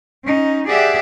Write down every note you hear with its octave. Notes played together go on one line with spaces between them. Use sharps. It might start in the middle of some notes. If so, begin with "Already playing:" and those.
C#4 D#4
G4 G#4 D5 E5 F#5